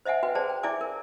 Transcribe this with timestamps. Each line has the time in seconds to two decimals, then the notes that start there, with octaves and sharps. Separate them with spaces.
0.05 C5 D#5 E5 F#5 G#5
0.23 F#4 B4 G5
0.35 G#4 C5 D5 A5
0.49 G5
0.63 E4 G#4 D5 E5 G#5 D6
0.81 A#4